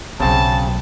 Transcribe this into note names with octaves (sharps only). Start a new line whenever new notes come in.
B1 C#3 F#3 C4 A5